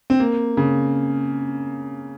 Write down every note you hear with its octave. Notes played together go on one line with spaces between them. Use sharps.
C4
A#3
C#3